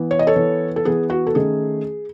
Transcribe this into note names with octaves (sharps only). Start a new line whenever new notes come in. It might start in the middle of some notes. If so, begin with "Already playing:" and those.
Already playing: E3 B3
C#5
D#5
A4 C#5
E3 B3
A4
E3 B3 G#4
F#4
A4
D#3 A3 C#4 G#4